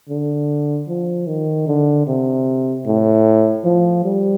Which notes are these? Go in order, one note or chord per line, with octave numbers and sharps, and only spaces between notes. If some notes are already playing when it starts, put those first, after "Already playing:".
D3
F3
D#3
D3
C3
A2
F3
G3